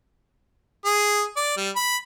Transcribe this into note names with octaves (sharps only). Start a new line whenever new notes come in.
G#4
D5
G3
B5